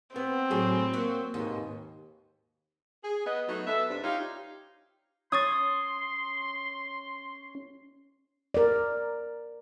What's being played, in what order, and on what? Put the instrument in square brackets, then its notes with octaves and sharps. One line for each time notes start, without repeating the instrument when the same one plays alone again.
[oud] B3 [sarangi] C4
[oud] A2 G#4 [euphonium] F#3
[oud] F#3 [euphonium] A#3
[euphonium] D#2 [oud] G#2 B2
[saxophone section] G#4
B3 D#5
F#3 A3 B3 D#4
B3 A4 E5
G2 C3 D4
D#4 F4 G4 C#5 F5
[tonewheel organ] C#4 [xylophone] C#5 C#6 A6 [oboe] C6 [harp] D#6
[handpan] A#4 D5